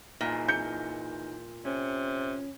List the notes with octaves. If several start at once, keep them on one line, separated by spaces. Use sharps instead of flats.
A#2 E3 D#4 G#4
G6 C#7
C3 C#4